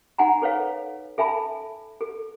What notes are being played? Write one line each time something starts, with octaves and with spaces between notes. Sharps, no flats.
D#4 F#5 G#5 A#5
A4 B4 C#5 F5
A4 E5 G#5 A5 B5
A4